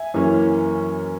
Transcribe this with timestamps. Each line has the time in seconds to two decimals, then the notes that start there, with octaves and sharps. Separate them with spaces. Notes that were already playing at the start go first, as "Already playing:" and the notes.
Already playing: E5 G#5
0.14 F#2 E3 A#3 C#4